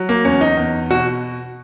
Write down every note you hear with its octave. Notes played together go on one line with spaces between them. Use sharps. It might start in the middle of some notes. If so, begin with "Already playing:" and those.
Already playing: F#3
A#3
E2 C#4
D#4
E2
B2 F#4